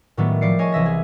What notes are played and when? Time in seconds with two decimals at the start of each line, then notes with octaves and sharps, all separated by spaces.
0.17 A2 D#3 F#3 G3 A3 B3
0.41 F3 G3 D5 C7 C#7
0.59 G#4 C#5 D#5 G#5 A5 C#6
0.72 C2 E3 E5 A#6
0.86 G#4